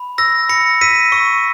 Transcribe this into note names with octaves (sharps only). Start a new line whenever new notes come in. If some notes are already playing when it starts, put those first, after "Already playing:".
Already playing: B5
E6 A#6
B5 A#6 C#7
E6 B6 D#7
C#6